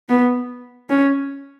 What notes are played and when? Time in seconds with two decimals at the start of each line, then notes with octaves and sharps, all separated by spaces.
0.09 B3
0.90 C#4